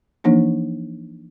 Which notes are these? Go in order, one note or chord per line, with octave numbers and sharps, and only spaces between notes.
E3 F3 A#3 D4 D#4